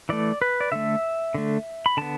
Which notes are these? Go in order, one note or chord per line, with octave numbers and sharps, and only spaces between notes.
E3 A3 D5
B4
D5
D3 A3 E5
D3 A3
B5
D3 B3 A5